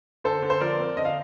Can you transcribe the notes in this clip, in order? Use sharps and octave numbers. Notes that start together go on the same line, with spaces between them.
D3 A4 C5
D3
C5
F3 A#4 D5
C4
D3 D#5
F5